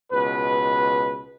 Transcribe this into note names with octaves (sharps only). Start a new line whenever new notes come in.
C#2 B2 B4